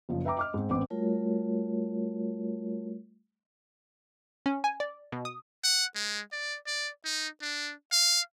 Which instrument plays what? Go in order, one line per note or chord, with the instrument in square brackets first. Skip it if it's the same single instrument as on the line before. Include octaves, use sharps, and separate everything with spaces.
[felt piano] F#1 F3
B4 E5 G5 A#5 D6
D#5 D6 F6
G#2 C4
A1 B3 C4 D6
[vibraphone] G3 A3 F4 F#4 A#4 C#5
[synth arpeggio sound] C#4
G#5
D5
B2
D#6
[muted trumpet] F#5
G#3
D5
D5
D#4
D4
F5